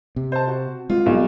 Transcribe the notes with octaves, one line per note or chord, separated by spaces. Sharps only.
C3
C5 A5
F#4
G#3 C4 F4
B1 G3